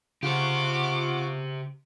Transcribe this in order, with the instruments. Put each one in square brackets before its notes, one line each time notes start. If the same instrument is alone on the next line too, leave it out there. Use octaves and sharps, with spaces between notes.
[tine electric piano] C#3 [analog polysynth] F4 F#5 C#6 [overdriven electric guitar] G4 C5 [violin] D6